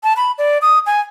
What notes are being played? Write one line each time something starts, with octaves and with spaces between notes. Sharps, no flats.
A5
B5
D5
D#6
G#5